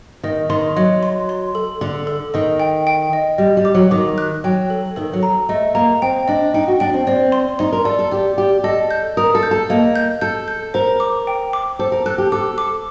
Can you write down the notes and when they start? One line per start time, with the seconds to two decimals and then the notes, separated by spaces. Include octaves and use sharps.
0.23 D#3 D#5
0.49 D#3 C6
0.76 F#3 D#5
1.03 C6
1.29 C6
1.55 A4
1.81 D3 A4
2.07 A4
2.34 D#3 D#5
2.60 G5
2.87 G5
3.13 D#5
3.38 G3 D#5
3.57 G3
3.65 D6
3.74 F#3
3.91 D#3 D6
4.18 F#6
4.44 F#3 G5
4.70 A4
4.96 D#3 A4
5.13 F#3
5.23 A#5
5.49 A3 D#5
5.75 A#3 A#5
6.02 C4 G5
6.28 D4 D#5
6.54 D#4 G5
6.68 F#4
6.80 D4 G5
6.94 C4
7.07 C4 D5
7.32 C6
7.59 D#4 C6
7.72 A#4
7.85 A4 D5
7.99 A4
8.12 G4 D5
8.38 G4 D5
8.64 A4 D#5
8.91 G6
9.17 A#4 D#6
9.35 A4
9.43 G6
9.51 A4
9.70 A#3 D#5
9.96 G6
10.21 A4 G6
10.48 G6
10.74 A#4 C5
11.00 D6
11.27 G5
11.53 D6
11.79 A4 C5
11.92 A#4
12.06 A4 F#6
12.18 G4
12.32 A4 D6
12.58 D6